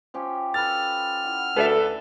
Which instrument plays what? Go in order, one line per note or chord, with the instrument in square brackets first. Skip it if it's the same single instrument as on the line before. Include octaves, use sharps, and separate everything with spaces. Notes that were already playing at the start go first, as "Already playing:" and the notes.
[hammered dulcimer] F3 C#4 G4
[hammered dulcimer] A4 B4 [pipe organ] F6 [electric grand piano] A6
[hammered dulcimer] E4 F#5
[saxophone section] D2 A4 [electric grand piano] B4 D5 E5